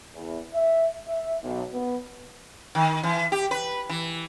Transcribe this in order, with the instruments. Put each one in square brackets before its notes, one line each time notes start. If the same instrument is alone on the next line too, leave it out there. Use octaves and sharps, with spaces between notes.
[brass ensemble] E2
E5
E5
B1
B3
[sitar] D#3
E3
G4
B4
E3